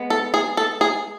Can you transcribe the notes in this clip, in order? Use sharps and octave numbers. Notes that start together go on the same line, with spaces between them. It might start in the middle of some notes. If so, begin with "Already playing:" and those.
Already playing: G#3 B3
A4
G#4
A4
G#4